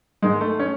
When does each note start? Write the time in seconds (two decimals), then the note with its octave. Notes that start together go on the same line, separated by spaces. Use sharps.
0.22 G#2 D#3 G#3
0.41 A3
0.59 C#4